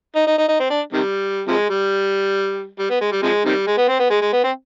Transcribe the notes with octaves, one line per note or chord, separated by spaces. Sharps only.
D#4
D#4
D#4
D#4
C4
D4
C3 D#3 G3
C3 F3 G#3
G3
G3
B3
G#3
G3
C3 F3 G#3
C3 D#3 G3
G#3
B3
C4
B3
G#3
G#3
B3
C4